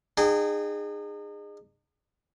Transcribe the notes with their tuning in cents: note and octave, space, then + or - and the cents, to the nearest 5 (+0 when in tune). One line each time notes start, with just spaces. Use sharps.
D#4 -40 G#4 -15 G5 -35